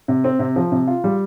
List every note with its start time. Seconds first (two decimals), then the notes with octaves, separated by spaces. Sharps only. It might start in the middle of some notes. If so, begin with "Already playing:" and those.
0.08 C3
0.24 C4
0.39 C3
0.56 F3
0.72 C3
0.88 F4
1.04 G3